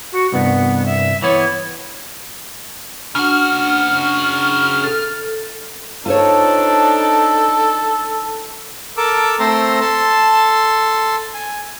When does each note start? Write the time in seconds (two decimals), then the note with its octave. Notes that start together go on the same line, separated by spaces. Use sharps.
0.12 F#4
0.32 C2 G2 B3
0.86 E5
1.22 E3 B3 C#5
3.15 C#3 D4 F#4 F6
4.84 A4
6.06 D4 D#4 F4 A4 C5 C#5
8.97 A4 A#4 A5 D6
9.39 A3 C4 A4 C5 A#5 C6
9.81 A4 A5 C6
11.34 G#5